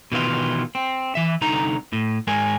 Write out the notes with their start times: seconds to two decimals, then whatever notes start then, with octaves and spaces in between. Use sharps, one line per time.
0.12 B2 D#3 E3 F4
0.75 C4
1.15 E3 E5
1.41 C2 D3 D#4 A#5
1.93 A2
2.27 G#2 G#3 A#4 G#5